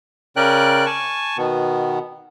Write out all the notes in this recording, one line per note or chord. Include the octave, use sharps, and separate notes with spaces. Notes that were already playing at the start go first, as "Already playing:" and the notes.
C#3 C#4 A#4 D5 G5 F#6
G#5 A5 C#6
B2 D#3 B3